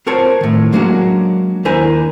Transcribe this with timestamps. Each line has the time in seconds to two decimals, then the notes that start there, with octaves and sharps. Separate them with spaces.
0.06 C4 F4 A#4 C5 C#5 A5
0.41 A2 D#3
0.73 F#3 G#3 A#3 C#4 D4 F#4
1.65 D#2 D4 E4 A#4 C5 G#5